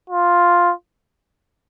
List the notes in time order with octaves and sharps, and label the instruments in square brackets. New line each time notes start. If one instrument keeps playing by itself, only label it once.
[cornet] F4